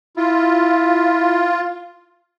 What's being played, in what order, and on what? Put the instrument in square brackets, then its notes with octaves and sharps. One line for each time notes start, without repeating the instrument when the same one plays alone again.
[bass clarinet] E4 [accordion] F4